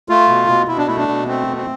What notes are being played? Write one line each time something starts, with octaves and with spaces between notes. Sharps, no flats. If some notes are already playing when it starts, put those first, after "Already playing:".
A3 F4
B2
B2
B2 E4
D4
A3 E4
D4
B2
A3 C4
B2
C4